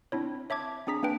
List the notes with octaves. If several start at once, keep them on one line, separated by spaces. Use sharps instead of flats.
C4 D4 E4 C#5
C#5 E5 A5 D6 G#6
C4 D4 G#4 A#5 B6
A#3 D4 B4 G5